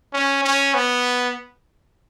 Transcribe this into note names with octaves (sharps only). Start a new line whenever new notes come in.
C#4
C#4
B3